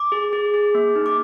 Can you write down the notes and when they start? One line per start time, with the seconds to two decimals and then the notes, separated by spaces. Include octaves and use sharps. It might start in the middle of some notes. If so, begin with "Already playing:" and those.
Already playing: D6
0.12 G#4
0.33 G#4
0.54 G#4
0.75 A#3
0.95 D#4
1.06 D6